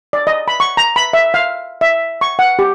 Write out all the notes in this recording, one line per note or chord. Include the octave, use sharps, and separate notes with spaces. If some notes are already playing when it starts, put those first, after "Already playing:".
D5
D#5
B5
C#6
A#5
B5
E5
F5
E5
C#6
F#5
G4